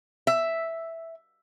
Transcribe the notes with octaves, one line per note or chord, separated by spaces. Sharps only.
E5